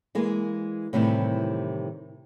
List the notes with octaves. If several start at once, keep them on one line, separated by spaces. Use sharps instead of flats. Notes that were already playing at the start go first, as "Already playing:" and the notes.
E3 G#3 A#3 G#4
A2 C3 D#3 E3 G3